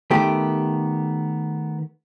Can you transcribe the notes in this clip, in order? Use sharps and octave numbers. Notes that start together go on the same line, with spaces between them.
D#3 A3 B3 G4